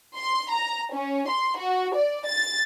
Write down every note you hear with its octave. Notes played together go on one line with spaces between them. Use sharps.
C6
A#5
C#4
C6
F#4
D5
A6